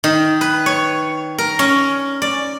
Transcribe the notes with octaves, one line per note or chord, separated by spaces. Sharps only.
D#3
B4
C#5
A#4
C#4
D5